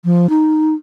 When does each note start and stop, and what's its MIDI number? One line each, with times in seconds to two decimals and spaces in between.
0.05 0.29 53
0.29 0.74 63